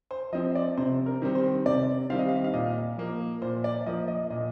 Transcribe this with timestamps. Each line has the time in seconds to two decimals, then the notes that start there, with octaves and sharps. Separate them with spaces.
0.11 C5
0.33 F3 C4 D#5
0.55 D5
0.78 C3 C5
1.06 A#4
1.22 D#3 G3 C4
1.35 C5
1.66 C3 D5
2.10 D#3 G3 C4 F5
2.19 D#5
2.29 F5
2.44 F5
2.53 A#2 D#5
2.97 F3 A#3
3.42 A#2 C5
3.64 D5
3.86 F3 A#3 D#5
4.08 D#5
4.30 A#2 D#5